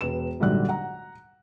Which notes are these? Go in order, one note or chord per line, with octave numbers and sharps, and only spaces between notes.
E1 B4 E7
A#1 G#2 D3 F#3 G3 F#6
F#5 A#5